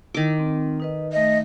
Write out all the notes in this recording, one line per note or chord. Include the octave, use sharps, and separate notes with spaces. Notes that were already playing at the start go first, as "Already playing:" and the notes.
D#3 E4 D6
C4
D#4 B4 D#5
A3 D#5 E5